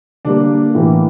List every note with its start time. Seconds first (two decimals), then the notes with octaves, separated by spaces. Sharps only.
0.25 D3 G3 A#3 D4
0.75 A2 E3 A#3